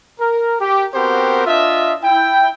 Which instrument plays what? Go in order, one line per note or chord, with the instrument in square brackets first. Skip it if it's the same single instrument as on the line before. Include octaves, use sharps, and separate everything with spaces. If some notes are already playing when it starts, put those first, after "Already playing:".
[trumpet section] A#4
G4
B3 C4 F#4 G4 A#4 C5
D4 F4 D#5 E5
E4 G5